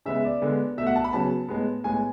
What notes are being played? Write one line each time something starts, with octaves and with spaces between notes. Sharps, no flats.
C#3 G#3 B3 E5
D5
D3 G#3 B3
B2 A3 E5
F#5
A5
B5
C#3 F#3 B3 A5
A2 G#3 B3
A2 G#3 B3 G#5